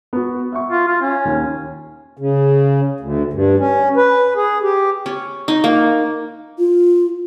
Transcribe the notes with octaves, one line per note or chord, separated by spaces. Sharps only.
B3 F#4
E5 F#5 C#6
F4
F4
C#4
D#2
C#3
D2
G2
C#4
B4
G#4
G4
C#4
D#4
A#3
F4